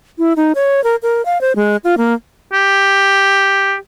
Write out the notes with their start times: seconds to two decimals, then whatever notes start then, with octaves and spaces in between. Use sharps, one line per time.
0.18 E4
0.36 D#4
0.55 C#5
0.84 A#4
1.03 A#4
1.25 F5
1.41 C5
1.56 G#3
1.84 F4
1.98 A#3
2.53 G4